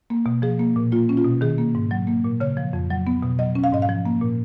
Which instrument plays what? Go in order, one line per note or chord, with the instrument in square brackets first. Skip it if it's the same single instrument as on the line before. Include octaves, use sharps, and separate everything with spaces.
[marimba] A#3
B2
F3 G#4
A#3
A#2
A#3 F4
C#4
F4
B2
D#3 G#4
A#3
G#2
F#3
A#3
A#2
C#3 C#5
F3
F2
F#3
B3
B2
F#3 D#5
C#4
F5
G#2 D#5
F5
F3
A#3
A#2